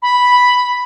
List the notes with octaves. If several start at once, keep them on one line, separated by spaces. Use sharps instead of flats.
B5